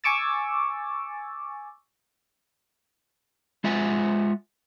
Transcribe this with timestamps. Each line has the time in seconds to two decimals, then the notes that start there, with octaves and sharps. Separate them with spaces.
0.04 G#5 C#6 D6 E6 A6
3.64 G#3 F4 E5 F#5 G#5